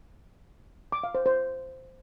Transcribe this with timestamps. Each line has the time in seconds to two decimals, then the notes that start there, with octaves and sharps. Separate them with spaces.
0.92 D6
1.04 F5
1.15 C5
1.26 C5